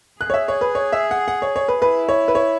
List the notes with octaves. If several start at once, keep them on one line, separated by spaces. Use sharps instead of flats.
G#4 F#6
C#5
E5
C#5
B4
C#5
E5
F#5
F#5
C#5
C#5
B4
E4 B4
C#5
B4
C#5